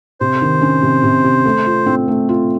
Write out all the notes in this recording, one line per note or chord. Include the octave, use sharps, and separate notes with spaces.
C3 C5
D#3
C#4
C3
C3
C3
A3
F4
C4
A3
F4